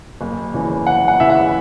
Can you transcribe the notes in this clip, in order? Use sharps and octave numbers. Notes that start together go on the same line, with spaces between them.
F#1
E2 C#3 E3
F#1 F#5
F#5
E2 C#3 E3 E5
F#5